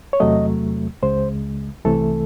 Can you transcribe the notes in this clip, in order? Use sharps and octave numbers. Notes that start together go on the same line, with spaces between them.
C#5
E2 C3 F#3 A3 D#5
C#2 C#3 G#3 C5
C2 C3 E3 A3 A4